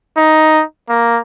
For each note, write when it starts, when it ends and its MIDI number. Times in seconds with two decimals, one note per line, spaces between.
0.17 0.63 63
0.89 1.19 58